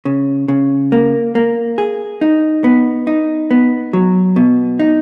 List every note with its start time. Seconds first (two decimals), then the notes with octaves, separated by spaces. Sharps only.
0.05 C#3
0.48 C#3
0.92 A#3
1.35 A#3
1.78 G#4
2.21 D#4
2.64 B3
3.07 D#4
3.51 B3
3.93 F#3
4.36 B2
4.79 D#4